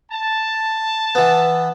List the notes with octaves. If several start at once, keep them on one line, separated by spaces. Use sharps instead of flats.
A5
E3 B3